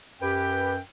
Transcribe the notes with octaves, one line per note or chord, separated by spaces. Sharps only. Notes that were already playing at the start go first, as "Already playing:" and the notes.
F#2 G4 B4 G5